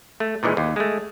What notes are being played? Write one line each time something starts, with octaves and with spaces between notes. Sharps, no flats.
A3
A#2 D#3 E3 G#3
D#2
G#3 A3